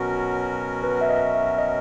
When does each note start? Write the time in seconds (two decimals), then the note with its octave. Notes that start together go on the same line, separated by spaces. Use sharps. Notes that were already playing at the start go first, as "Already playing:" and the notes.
Already playing: B2 F#3 C#4 F#4 A#4
0.83 B4
1.01 E5
1.09 D#5
1.34 E5
1.58 D#5